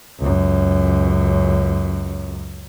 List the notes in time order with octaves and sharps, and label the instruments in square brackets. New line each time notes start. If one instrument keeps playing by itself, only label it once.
[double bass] C#2 F#2